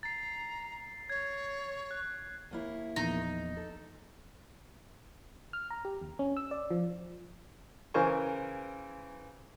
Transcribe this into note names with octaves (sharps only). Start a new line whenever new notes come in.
A#5 A6 C7
C#5 G#6
F#6
D#2 A#3 E4
A#1 E2 D#4
A4
F6
A#5
G4
D#2
C#4
E6
D5
F3
C#3 E3 A#4 C5 G#5 C#6